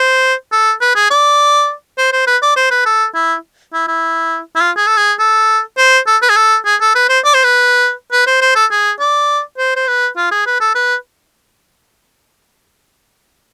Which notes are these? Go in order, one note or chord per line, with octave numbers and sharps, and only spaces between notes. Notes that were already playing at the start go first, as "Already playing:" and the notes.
Already playing: C5
A4
B4
G#4
D5
C5
C5
B4
D5
C5
B4
A4
E4
E4
E4
E4
F4
G#4
A4
G#4
A4
C5
A4
B4
G#4
A4
G#4
A4
B4
C5
D5
C5
B4
B4
C5
C5
A4
G#4
D5
C5
C5
B4
F4
G#4
B4
A4
B4